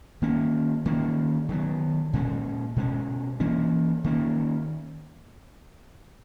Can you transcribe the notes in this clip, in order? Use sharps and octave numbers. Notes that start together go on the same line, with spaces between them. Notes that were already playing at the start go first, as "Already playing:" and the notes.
D#3 A#3 C#4
D#3 A#3 C#4
D#3 F#3 B3
A#2 G#3 C#4
B2 G#3 C#4
E3 A#3 C#4
D#3 A#3 C#4